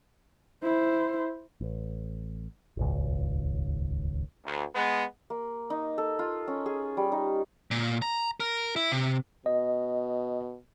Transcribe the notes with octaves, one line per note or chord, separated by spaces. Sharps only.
E4 C5
A1
D#1 G#1 C#2
D2
G#3 B3
A#3
D#4
A4
F4
C#4
G#4
G3
D#4
A#2
A#5
A#4
E4
C3
B2 D#5